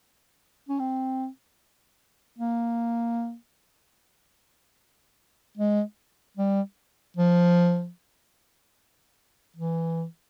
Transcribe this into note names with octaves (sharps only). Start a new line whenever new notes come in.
C#4
C4
A#3
G#3
G3
F3
E3